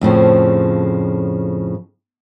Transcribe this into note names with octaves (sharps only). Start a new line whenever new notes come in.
F2 A2 C#3 F3